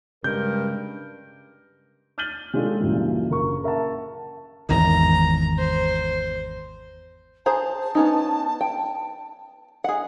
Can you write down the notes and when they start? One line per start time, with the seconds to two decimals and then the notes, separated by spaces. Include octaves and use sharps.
0.24 G2 C#3 G#3 A#4 G6
2.18 F6 G6 A6 D#7 F#7 G7
2.54 G#3 C#4 D4 F4 G4 A4
2.80 C#2 G2 A#2 E3 F#3
3.30 F#1 A#4 C#6
3.64 A#4 E5 F#5 A5
4.69 G#1 E2 D#3 A#5
5.58 C5
7.46 G#4 C5 A5 A#5
7.95 B3 C#4 D#4
8.61 G5
9.84 G#4 D#5 F#5